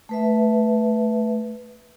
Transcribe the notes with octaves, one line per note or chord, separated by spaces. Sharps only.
A3 B4 E5